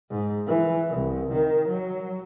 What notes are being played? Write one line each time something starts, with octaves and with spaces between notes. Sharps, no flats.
G#2
E3
C2
D#3
F#3